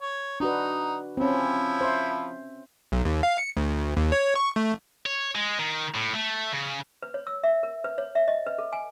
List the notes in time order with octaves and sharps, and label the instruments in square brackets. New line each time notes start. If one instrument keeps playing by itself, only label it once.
[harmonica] C#5
[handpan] D4 F#4 B4 [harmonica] D#4
[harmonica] F3 E4 [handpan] C4 C#4
[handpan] C5 E5
[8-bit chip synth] B1
D#2
F5
C#7
D2
D#2
C#5
C#6
A3
[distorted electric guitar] C#5
G#3
D#3
A2
A3
C#3
[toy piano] B4
C#5
E6
E5
A#4
B4
C#5
E5
D#5
B4
A4
G#5